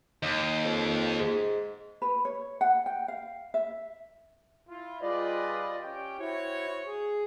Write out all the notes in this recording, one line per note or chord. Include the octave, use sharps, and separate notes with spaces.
D#2 D#4
F2
G#2
B4
C#5
F#5
G5
F5
E5
E4 F4
G3 F4 G#4 B4 D5 D#5
C#4 G4 G5
E4 F#4 C5 C#5
G#4